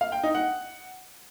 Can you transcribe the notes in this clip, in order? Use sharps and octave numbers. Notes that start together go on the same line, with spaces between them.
F5
G5
D#4
F#5